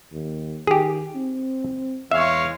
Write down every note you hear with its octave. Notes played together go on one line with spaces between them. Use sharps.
D#2
D#3 G4 G#4
C4
E2 G#3 C#5 E5 F5